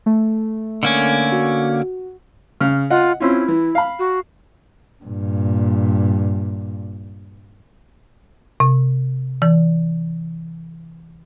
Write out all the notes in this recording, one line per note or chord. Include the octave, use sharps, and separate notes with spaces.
A3
D3 A#3 C#4
F#4
C#3 F6
F4 D#5 F#5
C4 C#4 E4 F4
E3
F5 B5
F#4
G2 A#2
C3
E3